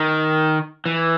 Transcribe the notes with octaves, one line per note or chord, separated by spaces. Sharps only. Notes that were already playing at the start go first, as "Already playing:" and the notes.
Already playing: D#3
E3